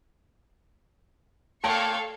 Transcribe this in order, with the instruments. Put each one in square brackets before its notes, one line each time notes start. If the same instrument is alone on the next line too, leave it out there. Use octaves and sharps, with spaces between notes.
[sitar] A#2 A3 C#5 [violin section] A4 F5 C#6 [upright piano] G5 A5